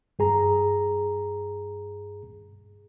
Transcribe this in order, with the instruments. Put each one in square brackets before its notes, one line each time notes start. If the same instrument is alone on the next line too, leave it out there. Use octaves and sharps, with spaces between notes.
[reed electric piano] G2 G#4 A#5